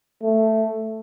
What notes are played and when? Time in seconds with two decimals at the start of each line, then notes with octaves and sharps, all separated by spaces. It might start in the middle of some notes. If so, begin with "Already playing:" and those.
0.23 A3